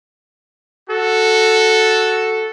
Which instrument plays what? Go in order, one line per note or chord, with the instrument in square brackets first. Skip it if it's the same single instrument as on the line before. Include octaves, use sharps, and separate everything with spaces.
[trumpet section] F#4 A4